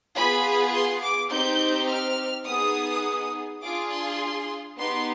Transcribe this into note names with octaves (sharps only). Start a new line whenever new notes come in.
B3 F4 G#4 B5
C6
D6
C4 D#4 G4 G6
F6
B3 D#4 G#4 D#6
D4 F4 G#4 D6
C6
B3 D#4 G4 C6